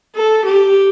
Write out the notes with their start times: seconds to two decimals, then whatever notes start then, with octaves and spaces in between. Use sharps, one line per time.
0.16 A4
0.46 G4